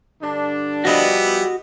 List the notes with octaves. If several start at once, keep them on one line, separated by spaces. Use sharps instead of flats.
G2 D3 D4
F3 G3 B3 E4 F#4 G4 D#5